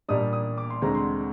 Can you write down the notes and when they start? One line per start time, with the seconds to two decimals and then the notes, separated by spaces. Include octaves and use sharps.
0.08 A#2 G3 A#3 D4 D#6
0.33 D#6
0.58 D6
0.70 C6
0.82 D2 D3 G#3 C4 A#5
0.95 C6